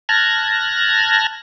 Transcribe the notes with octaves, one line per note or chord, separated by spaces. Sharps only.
A5 F6 F#6 G#6 A#6